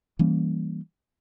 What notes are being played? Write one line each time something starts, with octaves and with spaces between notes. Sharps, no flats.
E3 G3 A#3 C#4